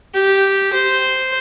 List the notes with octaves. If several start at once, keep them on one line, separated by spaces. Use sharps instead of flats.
G4
C5